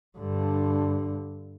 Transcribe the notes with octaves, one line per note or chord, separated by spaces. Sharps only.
G2 D3